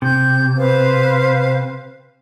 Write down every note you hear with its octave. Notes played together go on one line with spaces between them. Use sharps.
C3 G6
B4 C5 F5